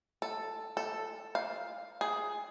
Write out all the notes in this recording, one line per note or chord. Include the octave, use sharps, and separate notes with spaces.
A4
A4
F5
G#4